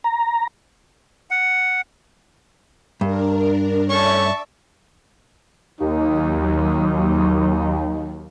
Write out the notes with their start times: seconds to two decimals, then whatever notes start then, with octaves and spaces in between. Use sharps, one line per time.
0.04 A#5
1.30 F#5
3.01 G2 D4 A#4
3.90 A3 C#4 C#5 D5 E5 A5 C#6
5.80 D#2 F#3 D#4